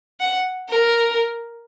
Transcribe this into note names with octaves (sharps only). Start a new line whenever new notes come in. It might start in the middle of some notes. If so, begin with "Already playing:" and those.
F#5
A#4